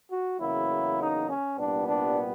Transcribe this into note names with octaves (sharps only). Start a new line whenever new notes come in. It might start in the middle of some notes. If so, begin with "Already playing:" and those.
F#4
E2 C#3 F#3 A#3 E4
D#4
C#4
C2 A#2 G3 B3 D4
D4